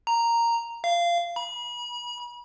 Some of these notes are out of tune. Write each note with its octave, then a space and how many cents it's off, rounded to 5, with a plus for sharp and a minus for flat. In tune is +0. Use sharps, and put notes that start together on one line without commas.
A#5 -5
F5 -20
B5 -40